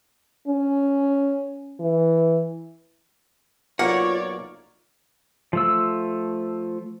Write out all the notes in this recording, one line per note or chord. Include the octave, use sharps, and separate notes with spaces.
C#4
E3
B1 A#3 F4 C#5 D5 F#5
F3 A3 E6